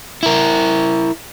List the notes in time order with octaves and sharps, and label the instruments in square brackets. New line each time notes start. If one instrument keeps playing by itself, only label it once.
[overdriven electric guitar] E4 A#4